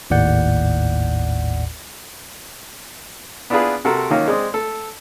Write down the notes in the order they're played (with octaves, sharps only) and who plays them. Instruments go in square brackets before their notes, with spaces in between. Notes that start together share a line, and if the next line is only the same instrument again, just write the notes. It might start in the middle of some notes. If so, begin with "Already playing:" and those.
[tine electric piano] G#1 D#2 A2 D5 F#5 G6
[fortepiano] B3 D4 E4 F4 G#4 B4
C3 F#4 A4 A#4
D#3 F#3 A#3 C#4 F4
G#3 C4 D5 D#6
A3 A4